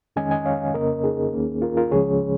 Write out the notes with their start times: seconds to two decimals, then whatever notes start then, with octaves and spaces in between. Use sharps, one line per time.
0.16 F2 D#3 G#3 C#4 D#5 G#5
0.31 D#5 G#5
0.46 C#5 F5
0.74 F2 C#3 A#3 C#4 A#4 D#5
1.04 D#4 G#4
1.33 D#2 D#3 A#3 C#4
1.62 F4 A#4
1.77 F4 A#4
1.91 C#2 C#3 F3 G#3 C#4 G#4 C#5